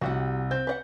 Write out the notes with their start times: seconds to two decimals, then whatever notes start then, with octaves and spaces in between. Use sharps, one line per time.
0.01 C2 C3 F#4 G4 F#5
0.51 C4 G6
0.67 B4 D5 F#5